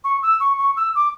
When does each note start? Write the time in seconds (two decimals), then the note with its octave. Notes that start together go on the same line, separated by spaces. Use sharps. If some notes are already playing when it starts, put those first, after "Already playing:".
0.04 C#6
0.22 E6
0.40 C#6
0.58 C#6
0.76 E6
0.95 D6